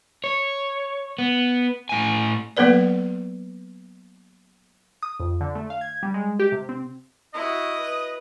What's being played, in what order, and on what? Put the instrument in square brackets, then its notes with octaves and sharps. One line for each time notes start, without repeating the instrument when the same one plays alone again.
[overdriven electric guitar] C#5
B3
A2 G#5
[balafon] F#3 A#3 B3 A4 B4 D5
[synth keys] D#6
F2
D3
A3
F5
G#6
G3
G#3
G4
C3
C4
[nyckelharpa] E4 F#4 [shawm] D#5
[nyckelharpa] B4